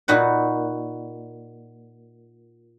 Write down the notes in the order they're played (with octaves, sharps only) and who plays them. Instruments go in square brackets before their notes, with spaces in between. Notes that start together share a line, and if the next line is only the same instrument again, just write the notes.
[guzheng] A#2 D#4 F#4 B4 F#5